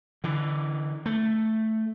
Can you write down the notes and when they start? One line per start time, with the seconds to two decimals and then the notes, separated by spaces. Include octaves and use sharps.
0.24 D3 E3
1.06 A3